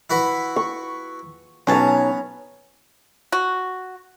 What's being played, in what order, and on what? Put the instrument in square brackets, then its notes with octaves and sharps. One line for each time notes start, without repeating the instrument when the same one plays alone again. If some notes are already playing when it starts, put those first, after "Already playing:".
[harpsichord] E4 F#4 B4
[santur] C#6
[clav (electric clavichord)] B1 C#5 A5 [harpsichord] B3 [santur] C#4 A#5
[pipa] F#4